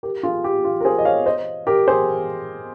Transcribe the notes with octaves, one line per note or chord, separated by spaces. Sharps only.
G4 A#4
F4 G#4
G4
F4
A#4
G#4 C5
D#5
C#5 F5
C5 D#5
G4 A#4
G#4 C5